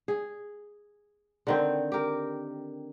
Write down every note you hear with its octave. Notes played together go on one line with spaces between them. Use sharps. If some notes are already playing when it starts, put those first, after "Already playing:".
G#4
D3 D#3 C4
G4 A#4